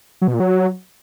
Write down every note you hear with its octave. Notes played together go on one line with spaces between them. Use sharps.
F#3
B2
A#2
F#3